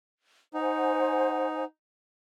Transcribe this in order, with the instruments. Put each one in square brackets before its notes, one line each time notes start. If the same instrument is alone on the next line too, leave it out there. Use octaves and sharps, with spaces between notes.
[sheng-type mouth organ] D#4 [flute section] C5 F#5 G#5